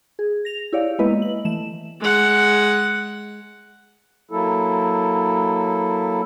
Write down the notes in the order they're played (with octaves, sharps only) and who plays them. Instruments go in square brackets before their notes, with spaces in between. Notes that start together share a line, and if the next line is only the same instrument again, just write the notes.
[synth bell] G#4
A#6 F7
E4 G4 C#5 D5 F5
G#3 A#3 B3 E4 B4 D#5
F#7
E3 A3 E7
[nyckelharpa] G#3 F#5
[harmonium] F#3 A#3 E4 A4